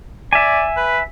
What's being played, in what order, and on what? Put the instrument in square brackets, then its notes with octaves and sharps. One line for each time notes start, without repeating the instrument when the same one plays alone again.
[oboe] D5 [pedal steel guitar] E5 G#5
[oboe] B4